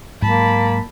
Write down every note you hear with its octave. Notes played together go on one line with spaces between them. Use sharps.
G#2 F#3 A#3 A5 B5